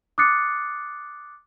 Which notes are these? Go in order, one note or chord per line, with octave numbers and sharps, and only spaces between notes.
D6 D#6 F#6 A6 C7 C#7